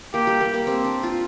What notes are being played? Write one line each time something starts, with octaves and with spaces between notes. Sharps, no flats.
A#3 G4
G3
A#3
A#3
C4
D4
F4